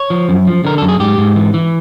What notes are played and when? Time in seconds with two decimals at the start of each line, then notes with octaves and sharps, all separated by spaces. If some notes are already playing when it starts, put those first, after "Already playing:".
Already playing: C#5
0.10 F3
0.29 F#2
0.47 F3
0.65 D3 A#4
0.78 F#2 A4
0.89 G#4
1.00 G#2 G4
1.18 G#2
1.36 E3
1.54 E3